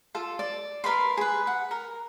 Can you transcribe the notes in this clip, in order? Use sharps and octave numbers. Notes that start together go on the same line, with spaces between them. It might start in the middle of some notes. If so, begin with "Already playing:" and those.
F4 A4
D5
A#4 B4 B5 C6
G#4 B4
F#5
A#4